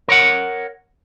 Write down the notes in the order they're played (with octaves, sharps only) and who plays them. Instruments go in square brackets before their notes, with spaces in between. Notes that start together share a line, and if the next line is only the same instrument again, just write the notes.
[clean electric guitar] A#4 C#5 F#5